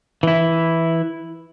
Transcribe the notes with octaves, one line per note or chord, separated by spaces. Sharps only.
E3 E4